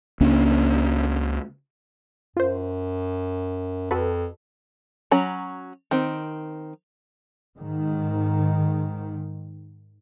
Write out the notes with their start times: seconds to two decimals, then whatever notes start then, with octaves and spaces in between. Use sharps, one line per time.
0.21 C#2 A#3 C#4 D4
2.37 F#2 F4 C5
3.91 F2 F#4 A4 B4
5.11 F#3 C#4 A#5 B5
5.91 D#3 C4
7.58 G#2 D#3